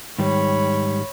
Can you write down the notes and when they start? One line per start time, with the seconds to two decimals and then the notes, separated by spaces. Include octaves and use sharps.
0.19 G#2 D#3 G3 C#5 B5